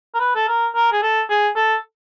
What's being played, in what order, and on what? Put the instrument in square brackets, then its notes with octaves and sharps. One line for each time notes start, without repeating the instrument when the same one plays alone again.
[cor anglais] A#4
B4
A4
A#4
A#4
G#4
A4
G#4
A4